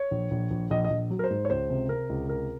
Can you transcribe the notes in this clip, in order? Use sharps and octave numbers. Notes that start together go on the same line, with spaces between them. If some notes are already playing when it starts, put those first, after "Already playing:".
Already playing: C#5
A#1
A#1
A#1
A#1 D#5
D#5
A#1
F#3
A#4
C5
G#2
C#5
C#2 C5
C3
C3 A#4
C#2
C3 A#4